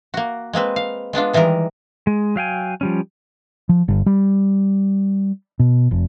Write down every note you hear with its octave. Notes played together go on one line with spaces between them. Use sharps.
A#3 F#4
G#3 A#3 C4 B4
F5
G#3 B3 D4 F4
D#3 E3 G3 G#3 A#4
G#3
F#3 F5 G5 G#5
F3 G3 C#4
F3
G1
G3
B2
F1